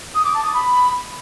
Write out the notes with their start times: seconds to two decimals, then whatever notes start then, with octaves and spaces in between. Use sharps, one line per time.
0.14 D#6
0.24 D6
0.34 A5
0.44 D#6
0.53 B5